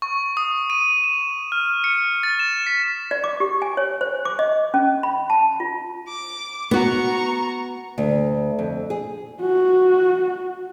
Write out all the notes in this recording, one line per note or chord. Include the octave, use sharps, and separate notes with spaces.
C#6
D#6
D#7
E7
F6
C#7
A6
E7
B6
D5
D6
G4
G#5
C#5
C5
D6
D#5
C#4
B5
A5
F4
D6
B3 F#4 A#5 C#6
D2
F2
G#4
F#4